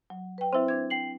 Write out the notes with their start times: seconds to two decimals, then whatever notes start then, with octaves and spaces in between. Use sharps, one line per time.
0.10 F#3
0.38 B4 G5
0.53 C4 E4 C5 E5
0.68 D4 G#6
0.90 G5 C7 F#7